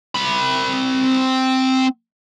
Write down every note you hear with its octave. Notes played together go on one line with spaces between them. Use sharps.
C4 B5